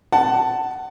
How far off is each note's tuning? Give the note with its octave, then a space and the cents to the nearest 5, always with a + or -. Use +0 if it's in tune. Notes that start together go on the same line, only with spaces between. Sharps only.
F#5 +25 A5 +0